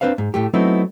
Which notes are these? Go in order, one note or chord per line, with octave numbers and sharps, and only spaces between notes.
C4 D4 B4 C5 F5
G#2
A2 A3 G4
F#3 A3 B3 C4 D#4 E4